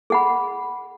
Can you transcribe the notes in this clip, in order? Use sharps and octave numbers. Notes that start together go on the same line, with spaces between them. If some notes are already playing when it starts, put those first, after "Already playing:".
G#4 F#5 B5